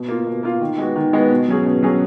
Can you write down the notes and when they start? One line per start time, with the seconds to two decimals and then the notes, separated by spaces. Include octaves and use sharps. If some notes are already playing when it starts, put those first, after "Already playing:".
Already playing: B2
0.08 A#3 F4
0.26 B2
0.43 A#3 F4
0.61 D#3
0.78 G#3 B3 F#4
0.96 D#3
1.13 G#3 B3 F#4
1.31 B2
1.48 F#3 C#4 G#4
1.66 B2
1.83 F#3 C#4 G#4